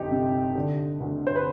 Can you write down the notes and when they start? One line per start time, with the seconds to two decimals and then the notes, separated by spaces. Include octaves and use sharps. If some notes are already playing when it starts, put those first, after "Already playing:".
Already playing: G1 F2 D#4 G4
0.11 C3
0.55 D3
1.00 D2
1.27 C5
1.36 B4